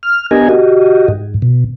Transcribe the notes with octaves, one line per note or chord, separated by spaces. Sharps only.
F6
B3 D4 G4 A#4 D#5 G#5
F#4 G4 D#5
G#2
B2